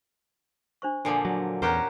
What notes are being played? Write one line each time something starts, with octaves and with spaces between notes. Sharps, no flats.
D4 C5 C#6
A#2 D3 F3 D4 A4 G#5
F#3
E2 C#4 G4 A#4 C5 F#5 A#5